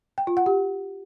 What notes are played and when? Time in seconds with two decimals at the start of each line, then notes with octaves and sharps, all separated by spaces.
0.18 G5
0.27 F4
0.37 F#5
0.46 G4